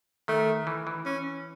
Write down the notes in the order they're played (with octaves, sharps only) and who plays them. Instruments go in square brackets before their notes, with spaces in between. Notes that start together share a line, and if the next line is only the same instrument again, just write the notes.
[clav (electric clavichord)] D#3 [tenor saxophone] A3
[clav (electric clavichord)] E3
E3
[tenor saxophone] C#4